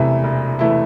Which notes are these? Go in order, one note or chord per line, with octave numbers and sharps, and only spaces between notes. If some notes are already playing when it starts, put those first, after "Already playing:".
Already playing: E1 E2 C3 E3 A3 E4
E1
E3 A3 E4